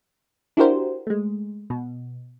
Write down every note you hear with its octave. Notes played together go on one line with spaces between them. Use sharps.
D4 E4 F#4 G4 A#4 C5
G#3 A3
B2